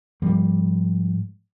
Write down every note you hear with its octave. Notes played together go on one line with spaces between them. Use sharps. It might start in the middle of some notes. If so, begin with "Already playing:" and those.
G#2 F3 G3 A#3